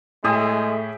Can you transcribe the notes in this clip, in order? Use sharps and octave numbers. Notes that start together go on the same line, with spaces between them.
A2 G#3 A3 G4 G#4 E5 D#6